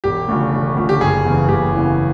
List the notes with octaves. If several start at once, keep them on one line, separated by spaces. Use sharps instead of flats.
E1 G4
D2 C#3 F3
E1
D2 C#3 F3
G4
F#1 G#4
E2 C#3 E3
F#1 G4
E2 C#3 E3